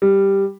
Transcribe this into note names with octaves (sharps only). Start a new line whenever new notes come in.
G3